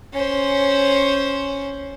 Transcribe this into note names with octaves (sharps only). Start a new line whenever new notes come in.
C#4 C5